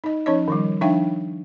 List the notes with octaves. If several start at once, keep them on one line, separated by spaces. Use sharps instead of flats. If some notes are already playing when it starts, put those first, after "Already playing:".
D#4 D#5
F3 C#4 D#4 C#5 D#5
D#3 F3 G3
F3 D4 D#4 E5 F5 G5